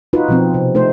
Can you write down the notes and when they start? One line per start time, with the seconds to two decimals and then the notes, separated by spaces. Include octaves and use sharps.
0.13 D#4 F4 F#4 B4
0.28 B2 F3 C4
0.54 C3
0.75 A3 D#4 C5